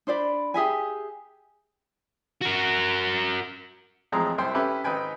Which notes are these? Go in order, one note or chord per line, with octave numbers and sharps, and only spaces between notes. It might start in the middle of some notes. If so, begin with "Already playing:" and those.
D4 C5 D5 B5
G4 G#4 E5 G#5
F#4 A#4
A1 F2 G#3 C4 G#4 A#5
C2 F#2 C5 G5 C6
C#4 E4 G4 A4 B4 E5
G#1 D#4 B4 G5 G#5